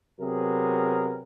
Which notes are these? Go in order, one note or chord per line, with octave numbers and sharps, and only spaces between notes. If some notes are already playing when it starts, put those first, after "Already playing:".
C3 F#3 B3 G#4 A#4